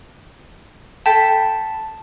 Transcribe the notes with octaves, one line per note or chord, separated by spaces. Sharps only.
A4 G5 A5 B5